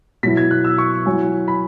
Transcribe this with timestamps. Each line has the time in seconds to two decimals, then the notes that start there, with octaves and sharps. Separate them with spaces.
0.23 B2 F#3 E4 B6
0.37 G#6
0.51 F#6
0.64 E6
0.78 C#6
1.06 F#3 E4 G#5
1.48 B5